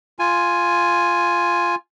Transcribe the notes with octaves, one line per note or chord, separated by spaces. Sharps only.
F4 G#5